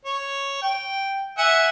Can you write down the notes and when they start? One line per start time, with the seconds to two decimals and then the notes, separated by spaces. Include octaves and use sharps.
0.05 C#5
0.62 G5
1.38 E5 F#5 G#5